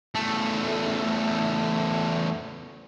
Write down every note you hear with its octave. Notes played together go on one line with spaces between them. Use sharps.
E2 A3